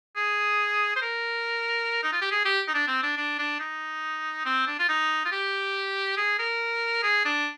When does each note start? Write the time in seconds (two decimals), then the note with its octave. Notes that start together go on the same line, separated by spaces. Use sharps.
0.16 G#4
0.96 C5
1.02 A#4
2.03 D#4
2.12 F4
2.22 G4
2.31 G#4
2.45 G4
2.68 D#4
2.74 D4
2.88 C4
3.03 D4
3.17 D4
3.39 D4
3.59 D#4
4.46 C4
4.67 D4
4.79 F4
4.89 D#4
5.25 F4
5.32 G4
6.17 G#4
6.39 A#4
7.03 G#4
7.25 D4